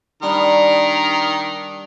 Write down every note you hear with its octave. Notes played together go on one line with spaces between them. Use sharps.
D#3 G3 D4 A#5